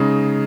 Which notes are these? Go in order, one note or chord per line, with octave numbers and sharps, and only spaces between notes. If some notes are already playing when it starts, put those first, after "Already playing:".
Already playing: C#3 G#3 D#4